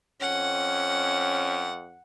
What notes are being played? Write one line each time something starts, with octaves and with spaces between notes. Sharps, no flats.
F2 C#4 F#5